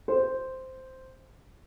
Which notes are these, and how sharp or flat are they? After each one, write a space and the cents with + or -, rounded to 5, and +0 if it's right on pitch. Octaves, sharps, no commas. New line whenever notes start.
C5 -5